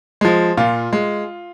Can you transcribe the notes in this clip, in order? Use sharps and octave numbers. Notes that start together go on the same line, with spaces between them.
F3 G#3
A#2 F4
G#3